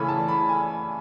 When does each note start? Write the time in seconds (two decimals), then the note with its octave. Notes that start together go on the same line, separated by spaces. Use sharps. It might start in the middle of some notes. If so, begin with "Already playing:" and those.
Already playing: C#3 E3 A3 C#4 B5
0.08 A5
0.28 B5
0.49 G#5